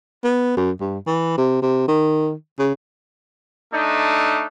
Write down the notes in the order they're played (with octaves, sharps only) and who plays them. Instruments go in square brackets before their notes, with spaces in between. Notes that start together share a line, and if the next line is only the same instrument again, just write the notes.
[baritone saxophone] B3
F#2
G2
E3
C3
C3
D#3
C#3
[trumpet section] A3 D4 D#4